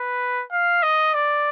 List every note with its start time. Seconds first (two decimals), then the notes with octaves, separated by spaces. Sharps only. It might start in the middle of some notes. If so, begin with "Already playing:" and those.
Already playing: B4
0.51 F5
0.83 D#5
1.14 D5